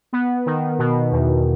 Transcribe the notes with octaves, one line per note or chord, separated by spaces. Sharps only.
B3
D#3
B2
E2